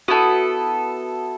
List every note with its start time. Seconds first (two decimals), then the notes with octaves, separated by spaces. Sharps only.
0.08 B3 E4 F#4 A4